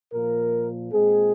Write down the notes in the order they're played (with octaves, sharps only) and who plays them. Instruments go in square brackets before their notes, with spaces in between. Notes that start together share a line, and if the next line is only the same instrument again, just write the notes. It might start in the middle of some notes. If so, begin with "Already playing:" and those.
[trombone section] A#2 F3 A#3 A#4
A#2 G#3 C4 G#4